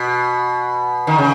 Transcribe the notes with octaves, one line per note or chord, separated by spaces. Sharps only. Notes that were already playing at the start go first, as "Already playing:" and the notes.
Already playing: B2
D#3
C#3